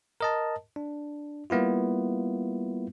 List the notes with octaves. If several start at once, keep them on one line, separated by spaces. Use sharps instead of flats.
A#4 D#5 A5
D4
G3 A#3 B3 E4 F4